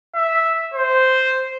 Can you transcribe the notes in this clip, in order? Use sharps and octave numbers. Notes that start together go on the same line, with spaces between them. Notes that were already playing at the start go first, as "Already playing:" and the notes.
E5
C5